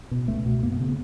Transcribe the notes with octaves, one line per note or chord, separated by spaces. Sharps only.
B2
C#2 A3
B2
F#2 A#3
B3
C#3 C4
B3